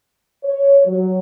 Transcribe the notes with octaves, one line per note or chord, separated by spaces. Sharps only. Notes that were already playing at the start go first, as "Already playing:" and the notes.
C#5
F#3